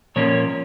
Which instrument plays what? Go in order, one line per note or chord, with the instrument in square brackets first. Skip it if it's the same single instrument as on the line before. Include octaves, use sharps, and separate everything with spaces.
[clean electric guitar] A#2 F3 A#3 C#4 C#5